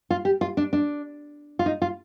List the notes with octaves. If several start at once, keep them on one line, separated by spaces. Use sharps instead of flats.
F4
G4
F4
D4
D4
F4
D#4
F4